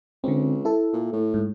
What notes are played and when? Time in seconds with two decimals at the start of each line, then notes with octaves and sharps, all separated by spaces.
0.24 C#2 D3 C4
0.65 E4 A4
0.93 A#2
1.13 A2
1.34 G#2